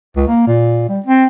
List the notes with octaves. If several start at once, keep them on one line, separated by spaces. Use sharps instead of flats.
C#2
A#3
A#2
G3
C4